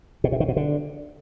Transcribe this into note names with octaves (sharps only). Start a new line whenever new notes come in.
B2
C3
D#3
B2
D3